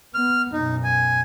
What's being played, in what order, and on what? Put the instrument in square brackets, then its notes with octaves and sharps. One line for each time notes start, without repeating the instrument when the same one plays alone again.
[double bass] B3 [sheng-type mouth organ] F6
[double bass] F#2 B2 [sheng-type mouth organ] D#4
[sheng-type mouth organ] G#5